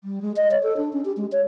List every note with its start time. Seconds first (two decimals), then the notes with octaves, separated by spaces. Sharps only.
0.04 G3
0.22 G#3
0.36 D#5
0.51 C#5
0.63 A4
0.77 D4
0.93 C#4
1.05 G4
1.17 G#3
1.32 C#5